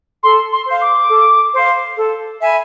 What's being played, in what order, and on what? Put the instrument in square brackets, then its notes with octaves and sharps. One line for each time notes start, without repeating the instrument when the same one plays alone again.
[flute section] A4 [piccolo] C6
[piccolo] C6
[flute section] C5 F5
[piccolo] D6
[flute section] A4
C5 F5
A4
E5 G#5 B5